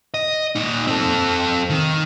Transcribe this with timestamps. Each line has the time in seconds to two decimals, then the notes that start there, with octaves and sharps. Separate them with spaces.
0.14 D#5
0.55 A#2 D#4
0.87 C4 A4
1.70 D#3